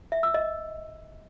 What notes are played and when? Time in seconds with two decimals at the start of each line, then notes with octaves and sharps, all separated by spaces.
0.12 E5
0.23 E6
0.34 D#5